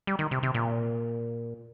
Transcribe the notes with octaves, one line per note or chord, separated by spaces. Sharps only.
G3
D#3
C3
C3
A#2